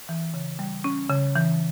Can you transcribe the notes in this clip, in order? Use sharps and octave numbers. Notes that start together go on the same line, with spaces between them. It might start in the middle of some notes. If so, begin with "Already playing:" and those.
E3
C#3
G3
C#4
C#3
E3